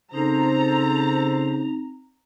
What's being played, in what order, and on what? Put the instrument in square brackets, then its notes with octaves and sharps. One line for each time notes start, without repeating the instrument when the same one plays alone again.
[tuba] C#3 [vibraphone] C4 D#4 [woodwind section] A4 C5 [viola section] A#5